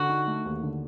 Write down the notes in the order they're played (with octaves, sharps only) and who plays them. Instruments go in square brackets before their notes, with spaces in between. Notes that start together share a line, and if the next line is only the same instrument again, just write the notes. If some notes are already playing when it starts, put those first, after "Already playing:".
Already playing: [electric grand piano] D3 [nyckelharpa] F#4
[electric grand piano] D#4
A3
D#2
D3